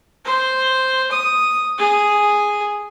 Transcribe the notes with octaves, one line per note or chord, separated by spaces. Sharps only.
C5
D#6
G#4